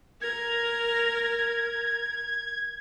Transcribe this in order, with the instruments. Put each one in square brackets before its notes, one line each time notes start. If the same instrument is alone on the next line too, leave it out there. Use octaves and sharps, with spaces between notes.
[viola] A#4 [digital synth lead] G#6